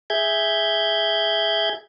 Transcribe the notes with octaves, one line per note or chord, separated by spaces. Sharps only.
G#4 E5 G6 G#6